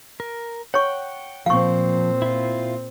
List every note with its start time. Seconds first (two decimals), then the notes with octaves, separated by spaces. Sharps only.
0.20 A#4
0.74 C#5 F#5 G5 C#6
1.46 A#2 F3 C4 F5 C#6
2.22 E4 F4